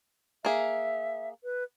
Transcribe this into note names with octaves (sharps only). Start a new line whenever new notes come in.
A#3 G#4 E5
B4